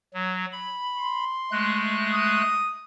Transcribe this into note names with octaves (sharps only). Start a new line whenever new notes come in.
F#3
B5
C6
G#3 A3 F#6
D#6